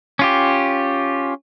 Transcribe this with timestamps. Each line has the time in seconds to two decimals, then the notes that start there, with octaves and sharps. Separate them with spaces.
0.19 C#4 F4 G4